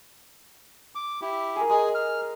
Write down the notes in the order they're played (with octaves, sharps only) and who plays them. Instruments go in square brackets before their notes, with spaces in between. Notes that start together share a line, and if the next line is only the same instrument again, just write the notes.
[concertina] D6
E4 G4
[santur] G#4 A#4
[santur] G#3 [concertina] G#4
[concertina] F6